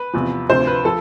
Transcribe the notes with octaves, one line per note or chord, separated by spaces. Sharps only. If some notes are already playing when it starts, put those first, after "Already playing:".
Already playing: B4
E2 C3 F3
D2 C3 F3 C5
B4
F3 A4